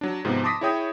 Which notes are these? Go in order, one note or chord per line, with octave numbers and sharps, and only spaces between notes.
F#3 D4
G#2 C3 F3 B3
A5 C6 D6 D#6 A#6 B6
E4 G#4 C#5 G5 D#6